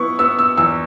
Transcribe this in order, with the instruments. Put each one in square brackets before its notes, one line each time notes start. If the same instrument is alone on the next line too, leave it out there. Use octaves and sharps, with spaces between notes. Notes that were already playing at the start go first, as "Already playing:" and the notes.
Already playing: [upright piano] B3 E4 C#6
B3 E6
E6
E2 E6